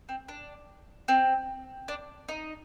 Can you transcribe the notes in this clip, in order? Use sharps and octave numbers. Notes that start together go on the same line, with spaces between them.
C4
D4
C4
D4
D#4